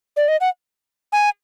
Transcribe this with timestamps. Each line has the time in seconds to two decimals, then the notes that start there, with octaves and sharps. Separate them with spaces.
0.17 D5
0.28 D#5
0.41 F#5
1.13 G#5